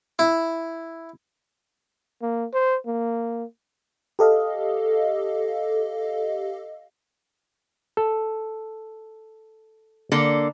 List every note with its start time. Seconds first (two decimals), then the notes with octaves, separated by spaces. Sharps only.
0.19 E4
2.22 A#3
2.53 C5
2.86 A#3
4.19 G4 A4 D#5 F5
7.97 A4
10.12 D3 A#3 A4